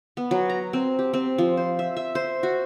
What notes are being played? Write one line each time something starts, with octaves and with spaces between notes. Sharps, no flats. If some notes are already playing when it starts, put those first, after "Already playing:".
B3
F#3
A#5
C4
G4
C4
F3
C5
E5
E5
C5
F#4